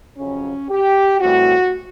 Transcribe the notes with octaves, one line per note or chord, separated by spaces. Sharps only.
F2 C#3 F#3 C#4
G4
A2 E3 G3 C4 F#4